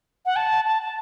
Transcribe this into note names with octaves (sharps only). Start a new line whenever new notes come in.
F#5
A5
A5
A5